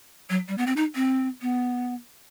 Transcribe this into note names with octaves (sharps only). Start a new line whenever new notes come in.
F#3
G3
B3
C4
D#4
C4
B3